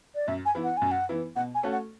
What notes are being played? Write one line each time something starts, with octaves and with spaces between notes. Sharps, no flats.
D5
F#2 E5
G#5
E3 B3 E4
F#5
F#2 G#5
F#5
E3 B3 E4
B2 F#5
G#5
A3 C#4 F#4 A4
F#5